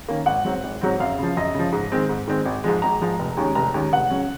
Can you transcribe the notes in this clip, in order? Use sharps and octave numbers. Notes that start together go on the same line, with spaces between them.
D#3 A#3 C#4
G#1 F#5
G#2 F#3 C4
G#1
G#2 F#3 C4
F#2 F5
C#3 F3
F#2 D#5
C#3 F3
G#2
D#3 G#3 C4
G#2
D#3 G#3 C4
G#1
G#2 F3 G#3
G#1 A#5
G#2 F3 G#3
F1
D#2 D#3 G#3 C#4
F1 A#5
D#2 D#3 G#3 C#4
F1 F#5
C#3 F#3 C#4